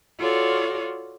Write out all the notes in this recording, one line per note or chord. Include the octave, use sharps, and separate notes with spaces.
F4 F#4 A4 C#5 D5